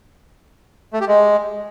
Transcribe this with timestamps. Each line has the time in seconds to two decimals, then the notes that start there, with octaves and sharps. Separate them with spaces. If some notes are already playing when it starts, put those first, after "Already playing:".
0.93 A3
1.01 G4
1.08 G#3